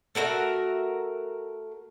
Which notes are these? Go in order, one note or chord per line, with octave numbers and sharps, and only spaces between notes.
A3 F#4 A#4 E5